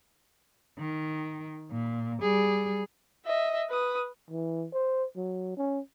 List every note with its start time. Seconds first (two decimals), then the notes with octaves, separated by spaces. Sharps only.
0.79 D#3
1.71 A#2
2.22 G3 G#4
3.26 D#5 E5
3.70 B4 D#6
4.30 E3
4.73 C5
5.17 F#3
5.58 C#4